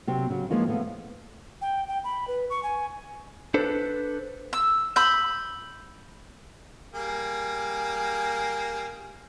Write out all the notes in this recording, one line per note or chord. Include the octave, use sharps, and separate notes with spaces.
C3 F#3 C4
C#3 F#3
E3 F3 G#3 A#3 C#4 D#4
C#3 F3 A3 B3
G5
G5
B5
B4
C#6
G#5
D4 A4 B4 C5
E6
B5 E6 G6
G3 A#3 G#4